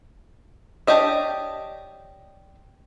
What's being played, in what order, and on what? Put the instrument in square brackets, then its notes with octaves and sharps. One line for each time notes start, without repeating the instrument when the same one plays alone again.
[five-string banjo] D4 G4 C#5 D#5 E5